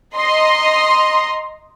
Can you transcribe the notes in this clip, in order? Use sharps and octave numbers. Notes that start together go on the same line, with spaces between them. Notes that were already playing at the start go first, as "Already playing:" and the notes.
D#5 A#5 C6